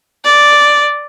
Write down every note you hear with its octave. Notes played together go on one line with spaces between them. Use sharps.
D5